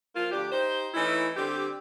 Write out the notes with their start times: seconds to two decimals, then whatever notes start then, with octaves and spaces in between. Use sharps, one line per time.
0.15 F3 A#3 F4
0.32 D2 D4 G4
0.51 D#4 G4 C5
0.94 E3 A3 C#4 D#4 E4
1.36 D3 G3 C4 G4